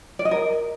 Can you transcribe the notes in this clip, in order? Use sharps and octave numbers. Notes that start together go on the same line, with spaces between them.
D5
D#5
A#4